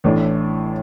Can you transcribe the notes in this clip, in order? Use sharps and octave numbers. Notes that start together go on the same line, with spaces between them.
A1 A2 E3 A3 D4